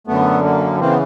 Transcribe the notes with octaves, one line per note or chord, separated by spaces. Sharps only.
F#2 D3 A3 B3
A#3
C#3 E3 A#3 C4
B3